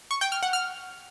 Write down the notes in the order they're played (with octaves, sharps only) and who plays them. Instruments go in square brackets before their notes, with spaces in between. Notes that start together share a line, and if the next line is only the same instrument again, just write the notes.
[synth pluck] C#6
G5
F6
F#5
F6